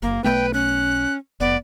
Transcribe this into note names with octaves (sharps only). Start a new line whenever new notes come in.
F#1 A#3
B1 A3 B3 B4 G5
C#4 F#6
F1 B3 D5